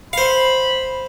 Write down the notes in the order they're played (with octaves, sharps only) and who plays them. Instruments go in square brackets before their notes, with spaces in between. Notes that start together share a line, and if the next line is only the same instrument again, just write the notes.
[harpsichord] C5 F5 [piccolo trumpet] B5